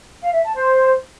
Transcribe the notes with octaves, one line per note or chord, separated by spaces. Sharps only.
F5
E5
A5
C5